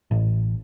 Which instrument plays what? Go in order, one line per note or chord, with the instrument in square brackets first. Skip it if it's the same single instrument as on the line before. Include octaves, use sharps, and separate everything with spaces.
[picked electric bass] A1